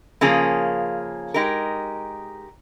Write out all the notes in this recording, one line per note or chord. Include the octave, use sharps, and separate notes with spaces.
C#3 F3 A#3 C#4 G#4
G#3 D#4 G4 A#4